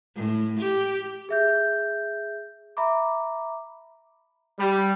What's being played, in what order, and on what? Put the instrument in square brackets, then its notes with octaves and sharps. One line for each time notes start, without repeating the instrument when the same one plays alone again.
[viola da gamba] A2
G4
[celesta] G#4 E5 G6
E5 A#5 B5 D6
[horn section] G3